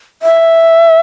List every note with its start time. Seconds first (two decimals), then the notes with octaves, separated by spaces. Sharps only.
0.23 E5